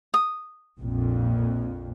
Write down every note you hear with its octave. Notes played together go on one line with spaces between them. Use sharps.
D#6
A#1 F2